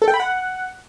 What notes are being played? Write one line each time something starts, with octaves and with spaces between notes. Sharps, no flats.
A4
G5
B5
F#5